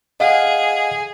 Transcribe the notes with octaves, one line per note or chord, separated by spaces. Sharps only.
G#4 D#5 F5 F#5